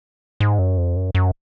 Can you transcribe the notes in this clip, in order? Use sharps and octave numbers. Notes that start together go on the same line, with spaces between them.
G#2
F#2
F2
F#2
F#2